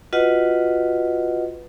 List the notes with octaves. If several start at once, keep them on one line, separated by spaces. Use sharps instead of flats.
F4 F#4 B4 D#5 F#5